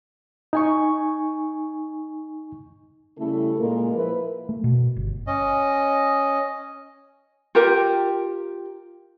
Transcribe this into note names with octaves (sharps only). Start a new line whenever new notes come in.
D#4 G#5 C#6
C#3 G3 A3 C#4 E4 A4
A#2 G#3 A#3 F4 A#4
F3 E4 A#4 B4
A3
B2
G1
C#4 D#5
F4 G4 A#4 G5